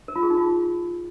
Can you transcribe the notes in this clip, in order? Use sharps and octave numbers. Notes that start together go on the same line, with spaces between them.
A#4
F4
G#4
D#4
F4